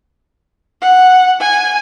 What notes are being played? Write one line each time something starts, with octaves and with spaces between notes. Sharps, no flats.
F#5
G#5